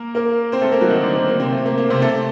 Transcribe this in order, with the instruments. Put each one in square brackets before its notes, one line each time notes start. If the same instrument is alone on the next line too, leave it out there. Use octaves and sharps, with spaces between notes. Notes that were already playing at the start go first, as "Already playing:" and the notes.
Already playing: [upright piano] A#3 A#4
A#3 A#4
C4 C5
A3 A4
A#3 A#4
F#3 F#4
D#3 D#4
D3 D4
A#3
A#3
C3 C4
A3
A#3
A#3
C3 C4
A3 A4